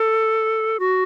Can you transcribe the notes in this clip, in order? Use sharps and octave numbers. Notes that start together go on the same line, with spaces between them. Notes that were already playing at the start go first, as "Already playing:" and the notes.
Already playing: A4
F#4